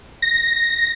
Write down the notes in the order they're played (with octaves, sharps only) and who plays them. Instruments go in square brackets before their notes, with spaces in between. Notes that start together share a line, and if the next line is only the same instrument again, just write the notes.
[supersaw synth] A#6